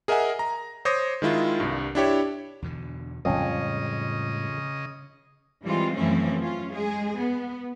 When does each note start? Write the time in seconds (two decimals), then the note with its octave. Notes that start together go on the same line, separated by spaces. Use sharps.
0.08 G#4 A#4 D#5 E5 F#5 G#5
0.39 A#5
0.85 C5 C#5 D6 D#6 A#6
1.22 D#3 G#3 E4 F4
1.60 C2 G2
1.95 D4 E4 G4 C#5
2.62 E2 B2 D3
3.25 F2 A2 C#3 G3 G#3 C#4 D#5
5.63 E3 G3 G#3 C4 F4
5.95 F#2 E3 F3 A3 C4 C#4
6.42 C#4 F4
6.71 G#3 G#4
7.19 B3